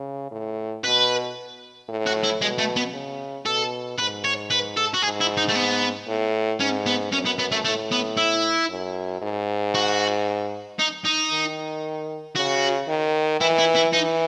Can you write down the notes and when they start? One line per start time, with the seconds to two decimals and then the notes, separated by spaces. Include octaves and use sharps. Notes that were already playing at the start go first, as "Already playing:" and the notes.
Already playing: C#3
0.31 A2
0.84 B2 B4
1.89 A2
2.07 F#4
2.24 E4
2.41 B2 G#3
2.58 A3
2.76 B3
2.94 C#3
3.46 B2 A4
3.98 G#2 B4
4.24 C#5
4.51 B4
4.77 A4
4.94 F#4
5.02 G#2 G#4
5.21 E4
5.37 D#4
5.49 A3
5.55 B3
6.07 A2
6.60 G#2 C#4
6.86 B3
7.13 F#2 C#4
7.26 B3
7.39 B3
7.52 A3
7.65 A2 A3
7.92 B3
8.17 E4
8.70 F#2
9.22 G#2
9.75 F#4
10.79 D#4
11.05 D#4
11.32 D#3
12.36 C#3 F#4
12.88 D#3
13.41 E3 E4
13.59 E4
13.75 E4
13.93 E3 D#4